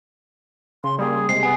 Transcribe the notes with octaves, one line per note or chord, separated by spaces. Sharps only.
C#3 C6
G3 A#3 G#4
C3 G#3 C7
B3 G#5